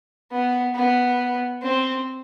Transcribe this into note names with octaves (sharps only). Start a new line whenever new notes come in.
B3
B3
C4